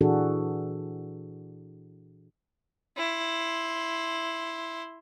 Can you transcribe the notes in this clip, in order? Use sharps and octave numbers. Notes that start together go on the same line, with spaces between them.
A#2 E3 D4 F#4 G#4 A4
E4 C6